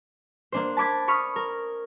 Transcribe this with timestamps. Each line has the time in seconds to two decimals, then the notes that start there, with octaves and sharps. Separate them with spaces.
0.52 A#3 D4 C5
0.77 A5 B5 D6 G#6 B6
1.08 B5 C#6 D#6 F6
1.36 A#4